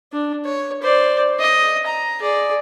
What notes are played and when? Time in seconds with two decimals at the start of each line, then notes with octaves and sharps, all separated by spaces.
0.12 D4
0.45 C#5
0.82 C5 D5
1.39 D#5
1.86 A#5
2.20 G#4 D5